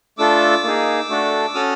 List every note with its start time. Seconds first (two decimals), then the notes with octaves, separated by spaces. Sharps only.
0.18 A3 D4 F4 A4 D6 E6
0.63 A#3 D#4 G#4
1.09 A3 D4 F#4 A4
1.54 C#4 F#4 A4 D#6 F6